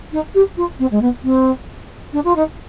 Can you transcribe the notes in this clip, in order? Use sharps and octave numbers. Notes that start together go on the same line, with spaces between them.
D#4
G4
F4
C4
G#3
B3
C4
D4
F4
D#4